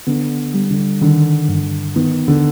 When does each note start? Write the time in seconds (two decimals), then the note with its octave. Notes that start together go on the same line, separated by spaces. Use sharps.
0.07 D3 B3
0.54 G3
0.71 D3
1.02 D3 D#3
1.49 G2
1.96 D#3 B3
2.28 D3